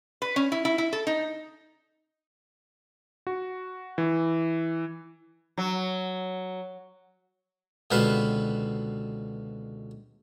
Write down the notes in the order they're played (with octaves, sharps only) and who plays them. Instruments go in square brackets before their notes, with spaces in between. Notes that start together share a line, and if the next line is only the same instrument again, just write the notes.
[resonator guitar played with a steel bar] B4
C#4
E4
E4
E4
A4
D#4
[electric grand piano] F#4
E3
[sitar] F#3
[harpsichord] C#2 B2 D3 C4 B4 F5